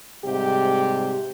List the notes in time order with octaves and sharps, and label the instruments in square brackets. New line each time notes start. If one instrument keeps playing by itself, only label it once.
[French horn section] G#2 C3 G3 G4